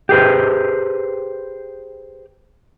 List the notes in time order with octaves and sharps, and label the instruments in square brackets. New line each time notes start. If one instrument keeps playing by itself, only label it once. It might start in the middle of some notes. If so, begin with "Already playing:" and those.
[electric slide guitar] G4 G#4 B4 C5